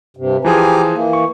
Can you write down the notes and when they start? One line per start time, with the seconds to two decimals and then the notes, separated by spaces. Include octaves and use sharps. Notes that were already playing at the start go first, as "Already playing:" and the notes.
0.17 G2 C3
0.45 E3 F3 G4 G#4 G#5 A#5
0.93 E3 A#3
1.13 C#6